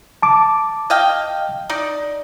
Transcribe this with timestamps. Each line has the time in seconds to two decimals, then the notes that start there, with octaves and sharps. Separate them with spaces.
0.22 A5 D6
0.90 D#5 F5 G5
1.69 D#4 D5